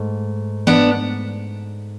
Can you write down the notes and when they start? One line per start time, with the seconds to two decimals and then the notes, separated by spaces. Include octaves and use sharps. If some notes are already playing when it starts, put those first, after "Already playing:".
Already playing: G#2 A3
0.67 B3 D4